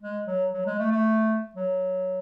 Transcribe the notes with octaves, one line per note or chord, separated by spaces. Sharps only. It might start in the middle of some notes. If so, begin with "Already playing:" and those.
G#3
F#3
F#3
G#3
A3
A3
F#3